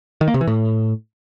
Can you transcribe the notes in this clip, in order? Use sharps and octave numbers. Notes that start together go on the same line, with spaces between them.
D#3
A#3
C3
E3
A2